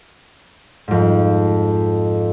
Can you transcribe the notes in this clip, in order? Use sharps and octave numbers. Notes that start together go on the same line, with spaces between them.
F2 G#2